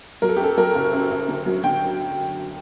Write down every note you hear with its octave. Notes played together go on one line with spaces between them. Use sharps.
F#3 A#4
A4
G4
F#2 A4
F#3 A#4
F#1
F#2
F#2
D3
F#3
D3 G5